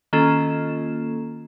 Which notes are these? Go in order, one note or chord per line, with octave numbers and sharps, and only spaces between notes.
D#3 A#3 C#4 F4 A4 E7